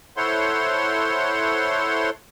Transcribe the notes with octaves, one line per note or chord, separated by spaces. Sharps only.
E4 A4 C5 C#5 F#5 C6